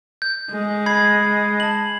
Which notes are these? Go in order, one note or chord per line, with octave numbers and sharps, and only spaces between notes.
G6
G#3
B5 G#6 C7
A5 F#7